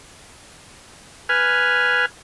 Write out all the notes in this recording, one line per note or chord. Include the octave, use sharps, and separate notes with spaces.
B4 G#5 F6